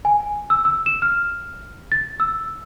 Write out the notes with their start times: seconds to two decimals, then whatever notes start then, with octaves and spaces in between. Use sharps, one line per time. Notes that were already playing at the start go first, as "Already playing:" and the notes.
0.05 G#5
0.50 E6
0.65 E6
0.86 E7
1.02 F6
1.92 A6
2.20 E6